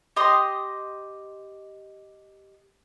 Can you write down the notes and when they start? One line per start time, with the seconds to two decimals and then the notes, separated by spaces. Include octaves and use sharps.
0.16 G4 D#5 C6 D#6